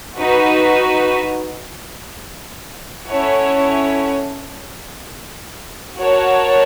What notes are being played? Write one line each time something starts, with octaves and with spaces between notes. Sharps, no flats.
D#4 F#4 B4
C#4 E4 A4 C#5 F#5
F#4 A#4 C#5 F#5 A5